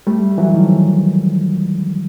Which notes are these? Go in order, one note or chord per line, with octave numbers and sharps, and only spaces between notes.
G3 A3
E3 F#3
D#3 F3